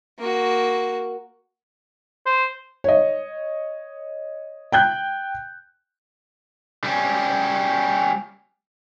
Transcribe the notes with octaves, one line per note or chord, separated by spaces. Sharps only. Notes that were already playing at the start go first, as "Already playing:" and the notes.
A#3 F#4
C5
C#5 D#5
G5 F#6 G6
G3 C#4